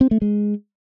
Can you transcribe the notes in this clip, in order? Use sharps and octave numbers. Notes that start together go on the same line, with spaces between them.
C4
A3
G#3